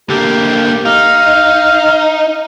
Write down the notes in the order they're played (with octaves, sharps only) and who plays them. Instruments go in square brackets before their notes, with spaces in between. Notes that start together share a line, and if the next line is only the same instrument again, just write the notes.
[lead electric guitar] D3 A#3 [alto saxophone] G4
[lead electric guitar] D#4 [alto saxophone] F5